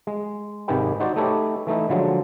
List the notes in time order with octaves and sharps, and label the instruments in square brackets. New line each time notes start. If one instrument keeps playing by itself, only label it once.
[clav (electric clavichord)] G#3
G#1 C3 D#3 G#4 B4 G5
D#4 F#4 C5 D5
A3 D#4 G4 A4 B4 C#5
E3 A3 D#4 E4
D3 F3 F#3 G#3